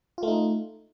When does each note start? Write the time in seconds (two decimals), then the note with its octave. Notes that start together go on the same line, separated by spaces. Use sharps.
0.18 F4
0.23 A3
0.28 D#4